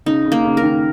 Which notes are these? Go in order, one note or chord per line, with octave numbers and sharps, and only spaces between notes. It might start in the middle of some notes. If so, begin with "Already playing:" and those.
C#3 D#4
C#3
A#3
C#3
A#4
D#3